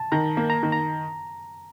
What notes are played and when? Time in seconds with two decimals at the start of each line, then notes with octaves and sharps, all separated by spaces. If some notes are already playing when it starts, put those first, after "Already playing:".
Already playing: A5
0.12 D#3 A#5
0.37 A#3
0.50 A#5
0.63 D#3
0.72 A#5